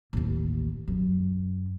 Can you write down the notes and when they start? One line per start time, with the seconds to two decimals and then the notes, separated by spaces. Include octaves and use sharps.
0.13 A1 D#2
0.88 F#2